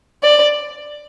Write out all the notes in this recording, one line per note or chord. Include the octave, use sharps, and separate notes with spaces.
D5